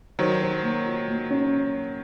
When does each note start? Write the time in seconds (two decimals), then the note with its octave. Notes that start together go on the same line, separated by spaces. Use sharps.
0.19 D#3 F#3 C5
0.41 C5
0.63 A#3
0.86 F4
1.08 A#3
1.30 C#4